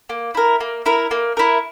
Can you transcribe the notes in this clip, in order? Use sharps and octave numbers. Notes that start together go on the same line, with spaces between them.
A#3
E4 A#4
A#3
E4 A#4
A#3
E4 A#4